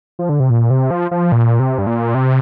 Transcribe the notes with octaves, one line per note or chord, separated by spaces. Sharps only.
F3
D3
C3
A#2
C3
F3
F3
A#2
C3
G2
A#2
C3